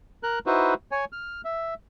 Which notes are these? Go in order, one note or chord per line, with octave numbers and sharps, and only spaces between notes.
A#4 F#6
D#4 E4 F#4 B4 C5
C#5 G#5
F6
E5